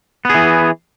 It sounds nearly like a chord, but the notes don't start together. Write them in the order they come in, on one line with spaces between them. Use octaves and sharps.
B3 G#4 E3